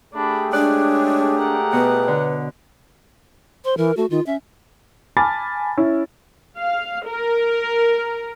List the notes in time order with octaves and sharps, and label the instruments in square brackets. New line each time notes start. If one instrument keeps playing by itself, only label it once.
[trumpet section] A3 G4 G#4 [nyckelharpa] D4 B5
[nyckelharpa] G#3 C#5 [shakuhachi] D4 [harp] D5 F#6
[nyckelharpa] A#4 F#5
[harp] B2 [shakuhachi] B4
[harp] D3
[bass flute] C5 [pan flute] C6
[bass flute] E3 [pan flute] A#4
[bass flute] A3 [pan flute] F#4
[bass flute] D#3 [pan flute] F4
[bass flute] C#4 [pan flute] E5
[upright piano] G#5 A5 B5 D6 F6 A6
C#4 E4
[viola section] F5
A#4